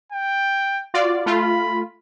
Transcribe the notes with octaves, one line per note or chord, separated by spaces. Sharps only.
G5
F4 F#4 D5
A3 F4 B5